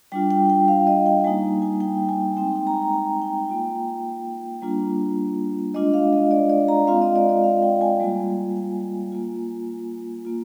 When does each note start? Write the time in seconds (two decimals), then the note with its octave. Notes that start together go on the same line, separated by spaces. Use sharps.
0.12 G3 D4 F4 G5
0.31 G5
0.50 G5
0.68 F5
0.87 D#5
1.06 G5
1.24 G3 A#3 D#4 G#5
1.62 G#5
1.81 G5
2.09 G#5
2.37 G#3 C4 D#4 G5
2.56 G5
2.67 A#5
2.74 G#5
2.93 G#5
3.22 G5
3.49 A#3 F4
4.62 G3 A#3 D4 F4
5.74 G#3 D4 F4 D#5
5.94 F5
6.13 D#5
6.31 D5
6.50 D5
6.68 A#5
6.87 G#3 C4 F4 F5
7.02 D#5
7.16 D5
7.29 D5
7.43 F5
7.62 G5
7.81 G#5
8.00 G3 A#3 F4
8.57 G#5
9.12 A#3 F4
10.25 A#3 F4